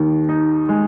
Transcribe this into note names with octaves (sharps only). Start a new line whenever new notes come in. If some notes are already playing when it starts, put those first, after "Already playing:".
Already playing: D#2 D#3
D#4
G#3